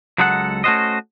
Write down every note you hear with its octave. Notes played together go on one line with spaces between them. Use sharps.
C#2 F#3 G#3 A4 C#5 F#5
A3 C#4 F#4 C5 D#5